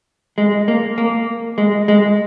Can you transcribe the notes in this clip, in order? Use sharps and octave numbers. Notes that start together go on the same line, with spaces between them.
G#3
A#3
A#3
G#3
G#3